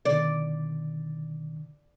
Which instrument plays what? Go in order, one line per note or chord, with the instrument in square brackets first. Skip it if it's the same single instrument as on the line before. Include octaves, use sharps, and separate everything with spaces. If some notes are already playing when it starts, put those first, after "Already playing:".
[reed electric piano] B2 D3 D#3 [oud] D5